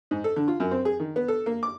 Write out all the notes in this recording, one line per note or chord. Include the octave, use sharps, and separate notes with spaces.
G#2
A4
D3
F4
F#2
C4
G#4
D#3
B3
A4
A#3
D6